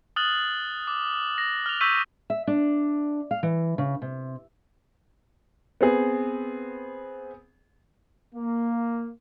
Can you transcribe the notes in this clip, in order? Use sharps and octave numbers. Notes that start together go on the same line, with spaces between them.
D#6 F6 F#6 A6 F#7
D6
A#6
F6 F7
C#6 E6 G6 B6 D#7
E5
D4
F5
E3
C#3
C3
B3 C4 G#4
A#3